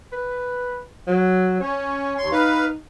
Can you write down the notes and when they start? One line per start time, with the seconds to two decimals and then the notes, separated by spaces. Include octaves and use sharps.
0.12 B4
1.07 F#3
1.60 C#4 C#5
2.18 D#2 C6
2.32 D#4 B4 F5